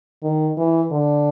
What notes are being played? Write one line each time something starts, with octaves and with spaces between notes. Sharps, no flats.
D#3
E3
D3